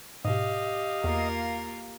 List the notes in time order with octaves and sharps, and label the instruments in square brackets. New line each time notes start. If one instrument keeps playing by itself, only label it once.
[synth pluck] G#2 B2 [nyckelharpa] G4 F5 [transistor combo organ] D#5
[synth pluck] E2 [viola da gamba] A#3 F4 A#4